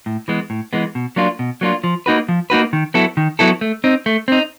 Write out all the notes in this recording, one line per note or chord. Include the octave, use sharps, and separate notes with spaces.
A2
E3 G#3 B3
A2
E3 G#3 B3
B2
F#3 A#3 D4 F4
B2
F#3 A#3 D4 F4
F3
A#3 D#4 F#4 B4
F3
A#3 D#4 F#4 B4
D#3
F#3 B3 E4 A4
D#3
F#3 B3 E4 A4
A3
C4 D#4
A3
C4 D#4